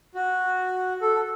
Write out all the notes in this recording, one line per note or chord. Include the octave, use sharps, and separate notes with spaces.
F#4
A4